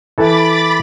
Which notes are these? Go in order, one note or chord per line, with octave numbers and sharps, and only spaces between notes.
E3 A4 B5 D6 A6